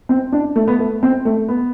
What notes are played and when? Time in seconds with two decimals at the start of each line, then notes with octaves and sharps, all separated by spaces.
0.09 C4
0.32 D4
0.56 A3
0.68 B3
0.79 A3
1.03 C4
1.25 A3
1.48 B3